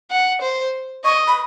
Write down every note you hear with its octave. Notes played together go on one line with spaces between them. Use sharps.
F#5
C5
D#5 C#6
B5